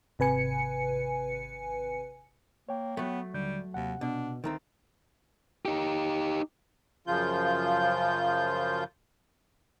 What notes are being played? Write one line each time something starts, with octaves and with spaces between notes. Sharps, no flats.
G#1 C3 B4 G#5 C#7
A#3 C#5 G5
F#3 A3 B3
D#2 D3 G3 G6
D#2 C3 F#5
B2 D4
D2 D#3 A3 C4 A#5
D#4 G4
F#2 C#3 F3 F4 G6